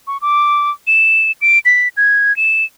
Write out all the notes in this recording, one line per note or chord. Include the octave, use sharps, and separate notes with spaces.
C#6
D6
E7
D7
B6
G#6
E7